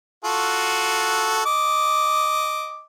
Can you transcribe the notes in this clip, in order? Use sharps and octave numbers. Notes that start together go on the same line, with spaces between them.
F4 F#4 A4
D#5 D6